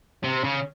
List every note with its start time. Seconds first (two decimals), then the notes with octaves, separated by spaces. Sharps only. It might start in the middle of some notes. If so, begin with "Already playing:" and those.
0.24 C3
0.44 C#3